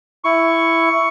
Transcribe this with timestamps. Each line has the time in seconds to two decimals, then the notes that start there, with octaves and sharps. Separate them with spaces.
0.24 E4 C#6